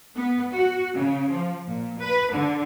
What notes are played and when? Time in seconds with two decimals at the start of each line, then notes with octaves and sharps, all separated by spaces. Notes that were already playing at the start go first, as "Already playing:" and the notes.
0.16 B3
0.52 F#4
0.94 C#3
1.31 F3
1.65 A#2
1.99 B4
2.30 D3